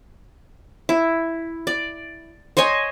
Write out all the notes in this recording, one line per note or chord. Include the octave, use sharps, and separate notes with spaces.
E4
D5
C5 C#5 D#5 G#5